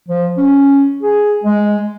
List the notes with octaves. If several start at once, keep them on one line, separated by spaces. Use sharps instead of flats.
F3
C#4
G#4
G#3